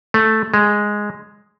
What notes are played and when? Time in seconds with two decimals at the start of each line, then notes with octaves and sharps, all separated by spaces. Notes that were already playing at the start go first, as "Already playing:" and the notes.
0.14 A3
0.54 G#3